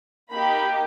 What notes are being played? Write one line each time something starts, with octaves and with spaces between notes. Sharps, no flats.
A#3 D#4 G4 B5